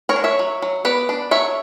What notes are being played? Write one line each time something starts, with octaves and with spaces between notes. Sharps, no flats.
A#4 C#5
D4
C#5 E5
F#3
F#3
B3 B4 D5
D4
F#3 C#5 E5